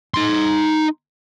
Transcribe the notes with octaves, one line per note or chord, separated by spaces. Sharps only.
D#4 C6